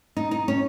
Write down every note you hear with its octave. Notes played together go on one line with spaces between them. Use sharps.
D#4
D#4
C#4